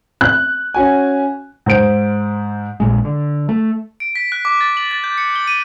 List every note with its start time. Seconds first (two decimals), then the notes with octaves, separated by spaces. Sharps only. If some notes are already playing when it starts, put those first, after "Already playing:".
0.21 F#6
0.74 C#4 F#4 G#5
1.66 G#2 C5 D7
2.80 A#1 A#2 G#3
3.05 D3
3.49 A3
4.00 D7
4.16 B6
4.32 F#6
4.45 D6
4.61 A6
4.77 F#7
4.91 A6
5.04 G6
5.18 C#7
5.36 G7
5.47 D#7